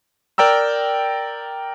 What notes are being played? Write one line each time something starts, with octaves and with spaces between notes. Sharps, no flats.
A#4 D5 G5 A#5 E6